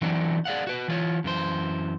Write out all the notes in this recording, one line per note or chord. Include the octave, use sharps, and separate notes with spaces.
E3 F#3 B3 C4 D4 D#4
G#4 D5 F5 F#5
F#4 B4
E3 F4 C#5
F#2 E3 C5